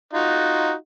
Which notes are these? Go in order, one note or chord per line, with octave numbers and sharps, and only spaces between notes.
D#4 F4 F#4